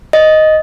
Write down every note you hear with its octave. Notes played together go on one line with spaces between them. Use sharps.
D#5